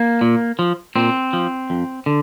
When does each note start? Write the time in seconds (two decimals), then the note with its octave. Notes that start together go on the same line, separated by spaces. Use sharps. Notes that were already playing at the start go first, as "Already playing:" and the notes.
Already playing: A#3
0.21 A#2
0.59 F3
0.96 A#2 C4
1.33 F3
1.70 F2
2.06 D3